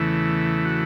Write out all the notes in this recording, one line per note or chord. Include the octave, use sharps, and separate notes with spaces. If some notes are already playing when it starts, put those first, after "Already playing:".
Already playing: E2 C#3 E3 A3
F#4